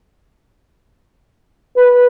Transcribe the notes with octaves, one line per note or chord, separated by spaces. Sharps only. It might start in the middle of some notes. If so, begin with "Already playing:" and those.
B4